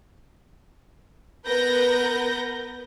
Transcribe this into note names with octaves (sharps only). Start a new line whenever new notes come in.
B3 A#4 B4 G6 A#6